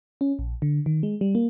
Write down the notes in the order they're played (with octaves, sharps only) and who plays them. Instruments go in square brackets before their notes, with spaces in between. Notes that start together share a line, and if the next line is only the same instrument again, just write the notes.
[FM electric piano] C#4
A#1
D3
D#3
G#3
G3
A#3